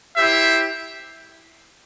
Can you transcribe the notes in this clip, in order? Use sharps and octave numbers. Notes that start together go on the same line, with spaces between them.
E4 G4 C5 E5